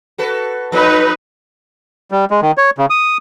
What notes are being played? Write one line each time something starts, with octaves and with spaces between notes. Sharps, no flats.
F#4 A4 B4
F3 B3 D#4 B4
G3
G#3
D#3
C#5
C#3
D#6